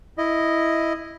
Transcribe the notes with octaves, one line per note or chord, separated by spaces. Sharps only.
E4 D#5